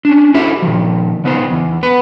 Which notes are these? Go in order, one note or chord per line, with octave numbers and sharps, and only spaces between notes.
C#4 D4
E4 F#4 G4 A4 C5 E5
A#2 D#3 F3
C#3 B3 D#4 C5
E2
B3 B4